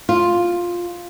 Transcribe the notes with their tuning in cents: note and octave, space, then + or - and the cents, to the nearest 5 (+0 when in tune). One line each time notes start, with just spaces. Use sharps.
F4 +5